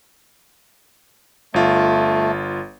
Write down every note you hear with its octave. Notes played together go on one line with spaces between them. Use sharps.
G1 A3 F4